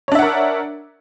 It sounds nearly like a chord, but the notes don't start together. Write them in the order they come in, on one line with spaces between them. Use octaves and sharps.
C#5 D4 E5 F#5 A#4